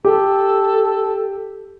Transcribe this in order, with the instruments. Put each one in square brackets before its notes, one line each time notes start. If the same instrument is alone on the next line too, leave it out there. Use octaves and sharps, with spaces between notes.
[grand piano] G4 [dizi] A4